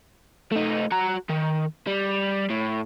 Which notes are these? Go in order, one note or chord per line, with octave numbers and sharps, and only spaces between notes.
A3 D#4
F#4 A#5
D#3
G3
A2